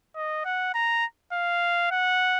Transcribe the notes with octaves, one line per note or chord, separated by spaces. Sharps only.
D#5
F#5
A#5
F5
F#5